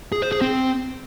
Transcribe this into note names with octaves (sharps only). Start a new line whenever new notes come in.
G#4
C5
G#4
C4